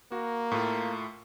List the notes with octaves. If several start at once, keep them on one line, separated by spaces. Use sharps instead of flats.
A#3 F#4
A2 A3 F4